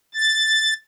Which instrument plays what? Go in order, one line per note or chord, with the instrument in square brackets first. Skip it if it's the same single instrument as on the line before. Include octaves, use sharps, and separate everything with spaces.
[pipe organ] A6